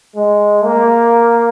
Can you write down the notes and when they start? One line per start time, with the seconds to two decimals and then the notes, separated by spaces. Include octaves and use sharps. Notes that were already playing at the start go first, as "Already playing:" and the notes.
0.16 G#3
0.65 A#3